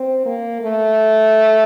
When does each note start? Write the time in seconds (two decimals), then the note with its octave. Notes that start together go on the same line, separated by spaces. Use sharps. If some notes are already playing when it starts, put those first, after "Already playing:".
Already playing: C4
0.26 A#3
0.62 A3